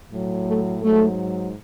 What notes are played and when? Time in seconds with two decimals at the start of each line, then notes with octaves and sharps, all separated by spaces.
0.11 A2 F#3
0.47 A3
0.82 G#2 F#3 A3